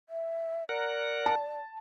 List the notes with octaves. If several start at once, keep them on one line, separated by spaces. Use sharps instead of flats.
E5
A#4 D5 F#5
A5